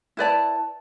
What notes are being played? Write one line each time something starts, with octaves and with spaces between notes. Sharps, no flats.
E4 B4 D5 A5